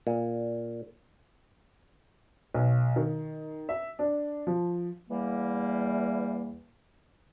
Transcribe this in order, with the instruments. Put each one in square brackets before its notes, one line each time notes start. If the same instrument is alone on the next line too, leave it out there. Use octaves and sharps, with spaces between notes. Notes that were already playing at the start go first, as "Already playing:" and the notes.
[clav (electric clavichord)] A#2
[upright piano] B1
D#3
E5
D4
F3
[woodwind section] E2 E3 G3 A#3